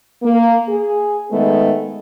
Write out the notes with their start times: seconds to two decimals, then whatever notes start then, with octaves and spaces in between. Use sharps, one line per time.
0.23 A#3
0.69 G#4
1.31 D#3 G#3 A3 B3